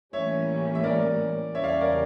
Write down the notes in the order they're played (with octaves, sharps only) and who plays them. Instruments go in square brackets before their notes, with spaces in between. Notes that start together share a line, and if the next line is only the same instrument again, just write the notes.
[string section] A2 E3 G3 A#3 C#4 [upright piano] C#5 E5
[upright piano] E5
A#4 D5
[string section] E2 C#3 G3 C#4 G4 [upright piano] C#5 E5
[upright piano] D5 F5
C#5 E5
A#4 D5